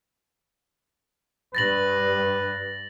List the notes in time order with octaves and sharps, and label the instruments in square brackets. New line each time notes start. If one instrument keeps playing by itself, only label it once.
[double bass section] G2 [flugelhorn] B4 [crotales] A6 A#6 F#7